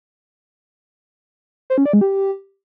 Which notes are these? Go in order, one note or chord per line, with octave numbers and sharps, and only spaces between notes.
C5
C#4
D5
G#3
G4